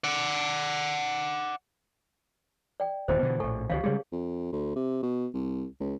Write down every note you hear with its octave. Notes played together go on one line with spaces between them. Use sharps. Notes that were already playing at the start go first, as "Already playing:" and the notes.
D5 F#5
D5 G5
D1 D#2 G#2 C5
B2 D3 E3
A#1 A2 A4 G#5 C#6
C#2 D#3 E3 G4 C#5 F5
C#3 G3 G#3 G#4 C#5
F2
D2
C3
B2
C2
C#2